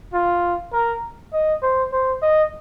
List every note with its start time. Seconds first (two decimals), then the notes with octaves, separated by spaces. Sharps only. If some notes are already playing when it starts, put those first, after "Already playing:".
0.14 F4
0.73 A#4
1.33 D#5
1.63 C5
1.92 C5
2.22 D#5